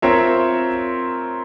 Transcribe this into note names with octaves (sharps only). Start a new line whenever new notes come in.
C4 F4 A#4 C#5 E5